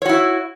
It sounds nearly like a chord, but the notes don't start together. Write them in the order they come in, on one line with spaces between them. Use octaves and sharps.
C#5 F#4 E4